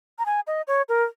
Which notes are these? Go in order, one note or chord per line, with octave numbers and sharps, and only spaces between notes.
A#5
G#5
D#5
C#5
A#4